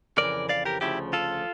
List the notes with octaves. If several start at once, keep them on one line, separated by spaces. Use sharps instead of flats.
F2 C#3 E3 A#4 D5
D5 F5
G4 A#4
D2 C#3 F3 E4 G4
F4 A4